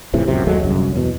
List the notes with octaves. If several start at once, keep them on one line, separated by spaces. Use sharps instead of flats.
A2 C3 E3 F3
D1 C#2 F#2 C3
D#2 F#3 G#3 A3
G1 C2 F#2 F#3
E2 B2